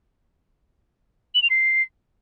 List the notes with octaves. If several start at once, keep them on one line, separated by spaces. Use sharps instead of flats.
F#7
F7
C7